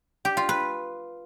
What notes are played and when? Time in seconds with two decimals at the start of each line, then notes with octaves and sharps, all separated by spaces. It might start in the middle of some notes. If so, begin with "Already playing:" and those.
0.25 G4
0.37 F4
0.49 B4